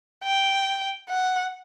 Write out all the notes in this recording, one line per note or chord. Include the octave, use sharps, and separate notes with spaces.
G5
F#5